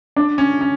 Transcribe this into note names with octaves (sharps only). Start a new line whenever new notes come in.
D4
C#4
C#4